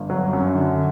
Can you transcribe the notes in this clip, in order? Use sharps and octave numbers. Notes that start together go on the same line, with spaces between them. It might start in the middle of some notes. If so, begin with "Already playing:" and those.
Already playing: G1
F#3
F#2
D3